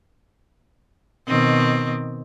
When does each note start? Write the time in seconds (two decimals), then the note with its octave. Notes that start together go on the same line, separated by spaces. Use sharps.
1.28 B2 D#3 C4